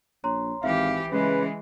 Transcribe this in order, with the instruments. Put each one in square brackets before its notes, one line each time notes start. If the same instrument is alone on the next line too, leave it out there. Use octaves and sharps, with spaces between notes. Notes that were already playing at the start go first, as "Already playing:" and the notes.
[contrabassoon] A#1 [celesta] C#5 A#5 C6
[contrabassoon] G#1 [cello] E3 G4 [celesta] E5 [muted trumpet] F5
[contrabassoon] C#3 [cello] E3 G#3 [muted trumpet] B4